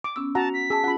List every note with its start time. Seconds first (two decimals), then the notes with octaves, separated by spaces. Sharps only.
0.04 D6
0.16 B3 C#4 E6
0.35 F#4 F#5 A5 A#5
0.54 B6
0.70 G#4 A5 E6
0.84 C#4 F4 G#4 F#5 B5